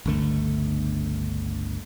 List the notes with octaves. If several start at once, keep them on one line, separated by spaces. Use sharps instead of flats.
G1 C#2 D3 A3